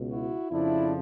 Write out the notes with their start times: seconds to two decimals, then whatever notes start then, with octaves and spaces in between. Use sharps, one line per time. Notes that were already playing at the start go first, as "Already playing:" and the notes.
Already playing: C#2 B2
0.11 E4 F#4
0.51 F2 C#3 F3 D4 E4